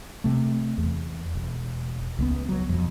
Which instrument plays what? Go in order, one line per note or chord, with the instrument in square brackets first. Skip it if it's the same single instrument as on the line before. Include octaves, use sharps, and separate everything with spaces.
[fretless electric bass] C3 A3
E2
E1
C#2 G#3 B3
F#3
E1 F2